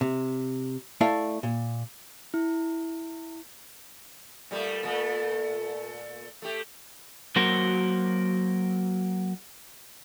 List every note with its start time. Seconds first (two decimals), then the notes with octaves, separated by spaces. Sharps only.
0.01 C3
1.01 A3 E4 D5 F5
1.43 A#2
2.34 E4
4.51 A#2 G3 A3
4.83 A#2 A3
6.42 A3 G4
7.36 F#3 A#3 F#4 A#4 C5